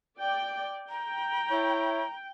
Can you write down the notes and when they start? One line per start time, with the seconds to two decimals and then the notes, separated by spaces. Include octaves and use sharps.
0.18 D5 G5
0.89 G5 A#5
1.51 E4 C#5